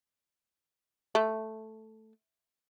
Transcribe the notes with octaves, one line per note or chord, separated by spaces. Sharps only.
A3